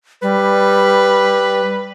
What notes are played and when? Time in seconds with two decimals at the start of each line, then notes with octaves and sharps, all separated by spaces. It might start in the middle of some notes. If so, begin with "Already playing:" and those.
0.22 G3 B4